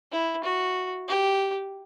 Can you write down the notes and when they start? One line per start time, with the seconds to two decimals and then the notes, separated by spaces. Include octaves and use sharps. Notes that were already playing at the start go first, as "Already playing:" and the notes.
0.12 E4
0.44 F#4
1.08 G4